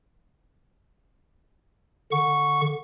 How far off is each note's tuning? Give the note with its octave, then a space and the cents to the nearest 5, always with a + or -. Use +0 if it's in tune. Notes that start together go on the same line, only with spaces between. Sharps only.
D3 +0 F#5 -20 C#6 +5